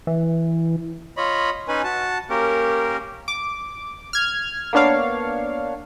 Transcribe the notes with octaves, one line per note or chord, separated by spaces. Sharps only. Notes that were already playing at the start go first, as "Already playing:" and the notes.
E3
F4 C#5 D#5 B5
C#4 D#4 B4 G#5
F#4 A5
A#3 C#4 G4 A#4
D6
F6 G#6
A#3 B3 D4 C#5 F5